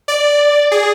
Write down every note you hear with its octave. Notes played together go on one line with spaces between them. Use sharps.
D5
G#4